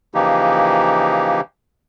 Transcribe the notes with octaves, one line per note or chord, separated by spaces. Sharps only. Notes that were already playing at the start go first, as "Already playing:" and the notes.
C#3 E3 F3 A#3 D#4 G4